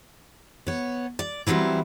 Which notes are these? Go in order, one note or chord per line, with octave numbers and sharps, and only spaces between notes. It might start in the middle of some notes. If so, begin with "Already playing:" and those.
B3 C#5
D5
E3 F#3 G3 C4 E4